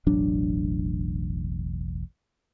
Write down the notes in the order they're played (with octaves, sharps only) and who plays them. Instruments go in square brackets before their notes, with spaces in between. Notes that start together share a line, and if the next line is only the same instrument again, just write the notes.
[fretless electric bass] E1 A1 F#3 D4